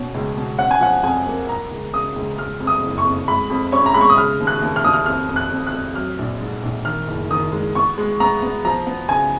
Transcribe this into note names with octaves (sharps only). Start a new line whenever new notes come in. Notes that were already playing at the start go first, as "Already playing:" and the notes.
Already playing: B2 C#4
C#2
B2
C#4 F#5
G#5
F3 F#5
F2 G#5
A#3
B3 A#5
C#2
C#3 D#6
C#2
G#3 F6
F2
D#6
F#1
C#6
F2
G#3 B5
F2
C#4 C#6
A#5
G#3 B5
C#6
D#6
C#3 F6
D#2
F#6
D#2
F6
D#2 D#6
F6
F2 F6
F2
F#6
F2
F#6
F2
F#3 F6
A#1
G#2
A#1
D#3 F6
F#1
D#3 D#6
G#3
B3 C#6
G#3
B3 A#5
B3
F3 A#5
B3
C#3 G#5